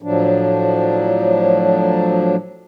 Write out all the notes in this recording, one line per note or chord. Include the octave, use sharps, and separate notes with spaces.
A2 F3 F#3 D4